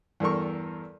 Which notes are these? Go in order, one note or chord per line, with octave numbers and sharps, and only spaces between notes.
E2 G2 A4 A#4 C#6